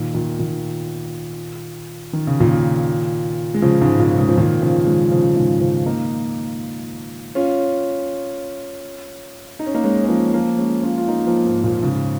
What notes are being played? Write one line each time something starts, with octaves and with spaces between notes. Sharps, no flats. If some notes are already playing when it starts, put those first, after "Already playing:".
Already playing: A#2 D#3
A#2 D#3
A#2 D#3
D#3
C#3
A#2 D#3
G#3
C#3 F3
G#2 C#3
A#2
G#2 C#3
F3
A#2 D#3
C#3 F3
D#3 G#3
C#3 F3
G#2 C#3
C#3 F3
A#3 D#4
C#4 F4
D#4
C#4
A#3 D#4
G#3 C#4
C#4
F3 A#3
F3 A#3
G#3 C#4
C#4 F4
F4
A#3 D#4
F3 A#3
G#2
A#2
G#2 C#3